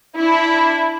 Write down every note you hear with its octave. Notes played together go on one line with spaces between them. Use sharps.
D4 E4